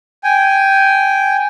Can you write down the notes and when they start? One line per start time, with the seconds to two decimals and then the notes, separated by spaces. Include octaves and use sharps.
0.24 G5 G#5